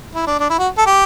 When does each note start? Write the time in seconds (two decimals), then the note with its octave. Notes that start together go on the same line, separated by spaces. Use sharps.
0.15 E4
0.27 D4
0.39 D4
0.50 E4
0.59 F#4
0.78 A4
0.86 G4